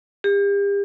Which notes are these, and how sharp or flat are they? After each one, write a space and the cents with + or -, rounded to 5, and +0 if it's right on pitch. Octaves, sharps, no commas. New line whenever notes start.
G4 +40